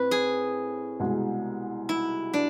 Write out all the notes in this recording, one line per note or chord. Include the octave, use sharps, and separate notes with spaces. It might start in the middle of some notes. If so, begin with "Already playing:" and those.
Already playing: A2 C4 B4
G#4
C2 B2 G#3
E4
D4